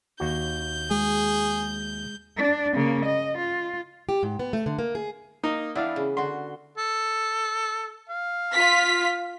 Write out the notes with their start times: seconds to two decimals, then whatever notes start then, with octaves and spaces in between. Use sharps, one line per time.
0.20 D#2 F#4 G6
0.91 G#3 G#4
2.37 D4
2.74 C#3 A#3
3.06 D#5
3.38 F4
4.09 G4
4.23 G#2
4.39 B3
4.53 A3
4.66 D3
4.79 A#3
4.95 G#4
5.43 A#3 D#4 D#5
5.75 E3 B3 D4 E4 D5 F5
5.96 C#3
6.17 D3 F#4 C6
6.78 A4
8.09 F5
8.52 F4 B6